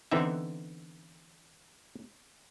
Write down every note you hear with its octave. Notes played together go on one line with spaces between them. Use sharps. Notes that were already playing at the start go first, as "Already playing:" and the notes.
D3 E3 B3 C4 D#4 E5